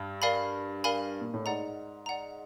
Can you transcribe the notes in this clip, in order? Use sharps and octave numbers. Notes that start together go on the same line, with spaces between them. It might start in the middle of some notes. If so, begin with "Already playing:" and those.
Already playing: G2
A#4 D5 F5 G#5 B5
A#4 D5 F5 G#5 B5
A#2
A2
G#2 D5 F#5 A#5
D5 F#5 A#5